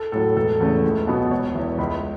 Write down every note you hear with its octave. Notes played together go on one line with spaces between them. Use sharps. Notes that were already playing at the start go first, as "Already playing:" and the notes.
Already playing: A4
A2 F#3 A4
E1 A4
E2 C#3 A3
C#2
B2 F#3 B3
E1 C#5
E2 E3 E5
C#2 B5